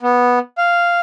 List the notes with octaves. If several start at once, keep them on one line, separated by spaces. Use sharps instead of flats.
B3
F5